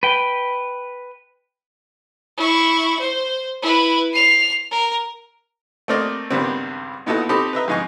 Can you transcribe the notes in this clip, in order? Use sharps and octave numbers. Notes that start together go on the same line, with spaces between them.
B4 G5
E4 C#6
C5
E4 B4
C7 F7
A#4
A3 A#3 C4 A#4 D5 D#5
C#2 G2 D#3 G3 B3 C4
A#2 B3 D#4 E4 F#4 A4
C4 D#4 G4 A4 B5 D#6
B4 D#5 E5 A#5
F2 G#2 D#4 D#5 G#5 C#6